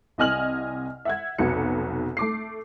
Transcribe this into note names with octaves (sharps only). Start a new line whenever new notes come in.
C2 C3 D#5 G#5 F6 F#7
E5 F#5 G#6
F1 B1 B3 F#4 C#7
A3 D6 C7